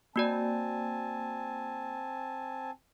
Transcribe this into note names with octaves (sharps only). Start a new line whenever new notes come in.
A#3 C4 F#4 D5 G#5 A5